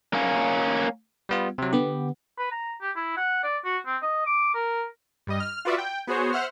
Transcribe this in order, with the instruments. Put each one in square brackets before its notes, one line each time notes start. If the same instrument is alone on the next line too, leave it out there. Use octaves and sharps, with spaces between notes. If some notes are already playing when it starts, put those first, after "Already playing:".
[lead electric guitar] A#3 C#4
[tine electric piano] G3 B3 F4
C3 F#3
[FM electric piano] D3 B3 [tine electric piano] G4
[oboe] B4
A#5
G4
E4
F#5
D5
F#4
C4
D#5
D6
A#4
[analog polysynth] G2 G3 D#5
F6
F4 F#4 B4 D5 E5 F#5
G5
B3 F#4 G#4 C5 C#5
C5 E5 F#5 F6